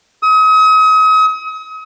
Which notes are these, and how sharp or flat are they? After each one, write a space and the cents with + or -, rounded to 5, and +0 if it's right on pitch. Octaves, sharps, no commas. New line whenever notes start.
D#6 +40